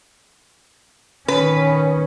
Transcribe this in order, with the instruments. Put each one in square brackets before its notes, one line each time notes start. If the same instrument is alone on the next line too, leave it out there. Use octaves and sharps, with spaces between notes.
[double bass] D#3 C#4 [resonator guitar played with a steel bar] B4